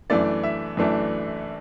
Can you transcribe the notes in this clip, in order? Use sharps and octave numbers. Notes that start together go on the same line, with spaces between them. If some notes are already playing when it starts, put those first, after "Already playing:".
F#2 E3 A3 D4 D5
E5
F#2 E3 A3 D4